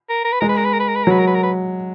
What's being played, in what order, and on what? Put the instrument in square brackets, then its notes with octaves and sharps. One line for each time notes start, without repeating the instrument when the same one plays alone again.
[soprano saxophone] A#4
A#4
B4
[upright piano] G#3 [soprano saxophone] A#4
[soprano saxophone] B4
A#4
B4
A#4
B4
A#4
B4
A#4
[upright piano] F#3 [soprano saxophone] B4
[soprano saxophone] A#4
B4
A#4
B4